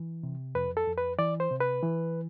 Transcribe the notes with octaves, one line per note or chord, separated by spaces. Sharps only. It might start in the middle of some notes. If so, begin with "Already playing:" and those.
Already playing: E3
C3
F2 B4
A4
F2
B4
E3 D5
C5
C3
B4
E3